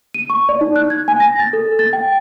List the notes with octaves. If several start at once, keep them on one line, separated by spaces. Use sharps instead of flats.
D#7
C#6
D5
D#4
F#6
G#6
G#5
A#6
A6
A4
A6
G5